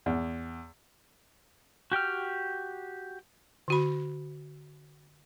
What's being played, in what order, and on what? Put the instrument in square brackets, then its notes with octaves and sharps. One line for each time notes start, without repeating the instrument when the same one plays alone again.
[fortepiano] E2
[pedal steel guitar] F#4 G4 G5 F6
[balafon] D3 F#4 B5